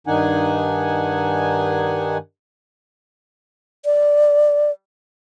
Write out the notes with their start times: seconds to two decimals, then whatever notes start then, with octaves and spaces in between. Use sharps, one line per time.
0.07 G2 D#3 D4 D#4 F#5 G#5
3.85 D5